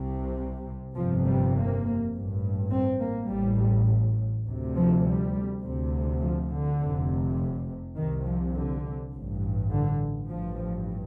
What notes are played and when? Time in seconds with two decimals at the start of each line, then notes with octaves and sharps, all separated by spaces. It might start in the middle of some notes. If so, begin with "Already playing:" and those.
Already playing: C2 C3
0.96 G1 F2 C3 F3
1.26 G3
1.55 A#3
2.13 A1 G2
2.71 C4
3.01 A#3
3.30 A1 A2 G3
4.47 D2 C3
4.76 F3
5.05 G3
5.64 D2 C3
6.22 F3
6.51 D3
6.80 F1 F2 C3
7.97 C2 C3 D#3
8.26 F3
8.55 D3
9.13 A1 G2
9.72 D3
10.30 A1 G2 F3